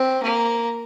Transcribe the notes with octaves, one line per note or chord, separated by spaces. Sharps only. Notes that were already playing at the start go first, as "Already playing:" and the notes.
Already playing: C4
A#3